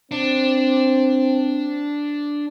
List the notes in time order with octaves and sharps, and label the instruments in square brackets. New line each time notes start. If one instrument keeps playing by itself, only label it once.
[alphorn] C4 [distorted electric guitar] D4